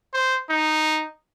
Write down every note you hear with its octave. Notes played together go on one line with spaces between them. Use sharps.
C5
D#4